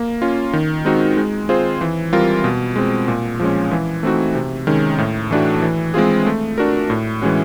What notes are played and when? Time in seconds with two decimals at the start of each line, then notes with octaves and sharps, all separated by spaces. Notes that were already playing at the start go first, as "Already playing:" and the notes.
Already playing: A#3
0.22 C#4 F4
0.53 D#3
0.85 G#3 C4 D#4 F#4
1.17 G#3
1.49 C4 F4 G#4 C5
1.81 E3
2.13 G3 C4 F4 A#4
2.44 B2
2.76 G#3 C4
3.08 A#2
3.40 F3 G#3 C#4
3.71 E3
4.03 A3 C4 D#4 F#4
4.35 C3
4.67 D#3 G#3 C#4
4.98 A2
5.31 E3 A3 D4 F#4
5.62 E3
5.94 G#3 C4 F4 G#4
6.26 A3
6.58 D4 F#4 A#4
6.90 A2
7.22 E3 G#3 C#4 F#4